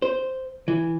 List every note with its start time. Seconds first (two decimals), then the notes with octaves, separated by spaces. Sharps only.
0.02 C5
0.68 E3